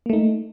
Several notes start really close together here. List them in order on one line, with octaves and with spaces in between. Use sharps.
A#3 A3 D#4